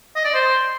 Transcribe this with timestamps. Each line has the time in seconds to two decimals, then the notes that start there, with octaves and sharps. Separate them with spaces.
0.16 D#5
0.25 D5
0.34 C5